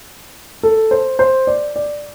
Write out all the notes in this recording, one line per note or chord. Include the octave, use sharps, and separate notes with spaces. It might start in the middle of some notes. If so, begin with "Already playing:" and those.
A4
C5
C5
D5
D5